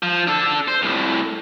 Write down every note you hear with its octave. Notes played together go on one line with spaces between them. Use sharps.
F3
D4 A4
C5
C2 A2